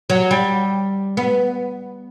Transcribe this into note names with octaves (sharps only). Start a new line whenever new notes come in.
F#3
G3
B3